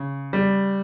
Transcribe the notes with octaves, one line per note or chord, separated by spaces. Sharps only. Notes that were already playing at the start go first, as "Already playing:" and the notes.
Already playing: C#3
G3